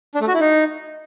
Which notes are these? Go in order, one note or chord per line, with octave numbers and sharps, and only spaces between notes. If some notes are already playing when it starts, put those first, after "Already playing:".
D4
A3
F#4
E4
D#4